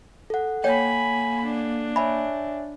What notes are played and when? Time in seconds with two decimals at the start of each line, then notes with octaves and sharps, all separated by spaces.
0.30 A4 F#5
0.64 A#3 C#5 G5 G#5 B5
1.44 D4
1.96 C#5 E5 G#5 B5